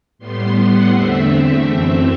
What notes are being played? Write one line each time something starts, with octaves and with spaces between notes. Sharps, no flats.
A2 G3 B3 C6
F#5
E2 D3 A3 C4 E5
F#2 E3 A3 C4